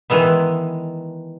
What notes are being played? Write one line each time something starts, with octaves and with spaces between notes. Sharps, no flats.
D#3 E3 G#3 B3